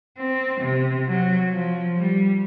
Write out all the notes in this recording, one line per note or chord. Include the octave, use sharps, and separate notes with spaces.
C4
C3
F#3
F3
G3